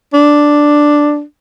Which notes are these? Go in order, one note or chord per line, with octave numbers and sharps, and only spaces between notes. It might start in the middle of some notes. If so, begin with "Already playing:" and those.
D4